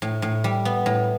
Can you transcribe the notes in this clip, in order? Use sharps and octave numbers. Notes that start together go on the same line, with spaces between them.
A2
A2
G3
B3
A2